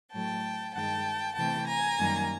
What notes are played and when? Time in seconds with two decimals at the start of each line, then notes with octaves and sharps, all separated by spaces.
0.12 A2 F#3 A3 G5 A5
0.74 G2 D#3 G#3 G5 A5
1.36 C3 E3 A3 G5 A5
1.67 G#5 A#5
1.97 F#2 D#3 G3 A#3